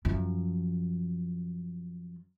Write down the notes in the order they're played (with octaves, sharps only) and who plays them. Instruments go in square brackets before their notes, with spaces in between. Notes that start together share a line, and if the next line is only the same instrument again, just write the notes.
[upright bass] F#2 F3